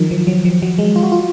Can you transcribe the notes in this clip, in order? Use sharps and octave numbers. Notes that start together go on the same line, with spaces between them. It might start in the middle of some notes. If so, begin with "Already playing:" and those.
Already playing: D#3 F3 F#3
F3
F#3
F3
F#3
G#3
F4
F#4
F4